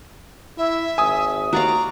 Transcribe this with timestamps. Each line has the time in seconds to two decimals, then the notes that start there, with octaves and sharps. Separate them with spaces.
0.58 E4 E5
0.98 G#1 G#5 D#6
1.53 D#2 F#4 D5 F5 A#5